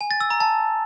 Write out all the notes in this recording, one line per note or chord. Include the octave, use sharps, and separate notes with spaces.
G#5
A6
E6
A#5
A5